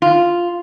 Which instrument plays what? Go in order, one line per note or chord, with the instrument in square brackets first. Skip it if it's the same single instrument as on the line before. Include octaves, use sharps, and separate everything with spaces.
[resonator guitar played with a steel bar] F4